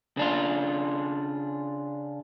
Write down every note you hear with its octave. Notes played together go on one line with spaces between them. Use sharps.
C#3 D4 F4